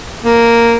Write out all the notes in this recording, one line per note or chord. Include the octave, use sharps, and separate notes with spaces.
A#3